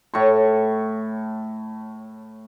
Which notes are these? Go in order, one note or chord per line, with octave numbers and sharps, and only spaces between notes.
A2 C#6